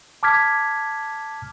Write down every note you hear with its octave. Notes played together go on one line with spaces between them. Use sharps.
A5 D6 F6 G#6 B6